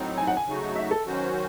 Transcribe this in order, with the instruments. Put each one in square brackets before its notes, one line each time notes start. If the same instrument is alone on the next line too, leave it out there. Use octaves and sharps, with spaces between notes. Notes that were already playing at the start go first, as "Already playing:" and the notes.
Already playing: [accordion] A2 F#3 C4 D#4
[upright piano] G#5
F#5
G#5
[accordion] C#3 F#3 A3 D#4 F#4
[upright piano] E5
A4
[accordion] D#3 F#3 C#4 F#4 C5